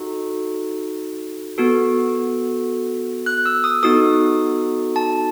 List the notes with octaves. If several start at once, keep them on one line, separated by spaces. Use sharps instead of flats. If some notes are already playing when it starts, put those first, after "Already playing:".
Already playing: D#4 F#4 A4
B3 F#4 A4
F#6
E6
D#6
B3 D#4 F#4 A4 D#6
A5